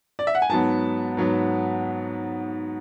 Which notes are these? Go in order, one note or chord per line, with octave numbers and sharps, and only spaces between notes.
D5
E5
F#5
G#5
G#2 F#3 B3 A5
G#2 F#3 B3